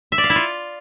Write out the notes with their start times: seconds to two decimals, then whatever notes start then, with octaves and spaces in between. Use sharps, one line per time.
0.12 E5
0.18 D5
0.24 F5
0.30 E4
0.36 F4